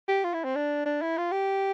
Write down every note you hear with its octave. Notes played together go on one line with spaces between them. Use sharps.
G4
F4
E4
C4
D4
D4
E4
F4
G4